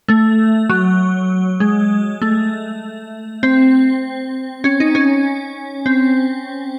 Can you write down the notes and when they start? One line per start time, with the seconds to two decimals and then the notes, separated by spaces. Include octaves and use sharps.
0.08 A3
0.69 F#3
1.60 G#3
2.22 A3
3.43 C4
4.64 C#4
4.80 D#4
4.95 C#4
5.86 C4